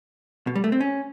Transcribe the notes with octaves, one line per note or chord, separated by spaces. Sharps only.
B2
G3
A3
C4
C#4